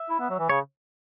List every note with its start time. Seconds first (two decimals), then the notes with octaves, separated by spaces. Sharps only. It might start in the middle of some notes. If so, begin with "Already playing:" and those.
Already playing: E5
0.10 E4
0.20 B3
0.30 F#3
0.39 E3
0.49 C#3 C#5